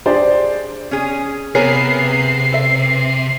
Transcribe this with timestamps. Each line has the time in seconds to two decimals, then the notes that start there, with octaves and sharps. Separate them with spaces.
0.06 D4 G4 G#4 C5 D5
0.91 C#4 G#4
1.55 C3 B3 G#4 A#4 B4 C#5 C7
2.52 A4 E5